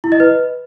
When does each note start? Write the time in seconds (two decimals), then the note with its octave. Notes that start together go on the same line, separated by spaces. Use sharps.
0.04 E4
0.12 D#5
0.20 B4